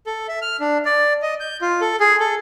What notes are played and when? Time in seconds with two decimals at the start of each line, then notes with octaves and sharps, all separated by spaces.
0.06 A4
0.28 E5
0.42 F6
0.60 D4
0.85 D5
1.22 D#5
1.40 G6
1.62 F4
1.81 A4
2.00 G#4
2.20 A4